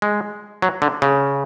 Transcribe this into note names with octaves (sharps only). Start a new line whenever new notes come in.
G#3
F#3
D3
C#3